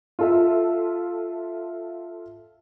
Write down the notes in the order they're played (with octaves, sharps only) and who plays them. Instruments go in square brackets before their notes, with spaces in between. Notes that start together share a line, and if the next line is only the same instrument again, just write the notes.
[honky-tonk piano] F4 A4 E5